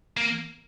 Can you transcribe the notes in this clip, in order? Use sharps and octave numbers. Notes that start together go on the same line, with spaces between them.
A#3